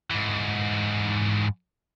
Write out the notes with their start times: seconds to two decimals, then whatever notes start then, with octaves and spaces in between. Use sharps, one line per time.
0.11 G#2 E3